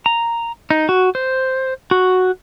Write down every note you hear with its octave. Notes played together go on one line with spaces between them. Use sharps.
A#5
D#4
F#4
C5
F#4